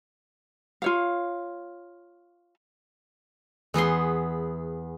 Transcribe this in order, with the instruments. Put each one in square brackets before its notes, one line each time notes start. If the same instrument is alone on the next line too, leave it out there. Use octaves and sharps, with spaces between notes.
[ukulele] F4 C#5 F5
[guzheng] E2 B3 G#4 C6